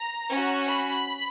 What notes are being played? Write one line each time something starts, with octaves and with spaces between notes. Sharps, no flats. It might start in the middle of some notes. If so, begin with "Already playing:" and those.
Already playing: A#5
C#4 F#4
B5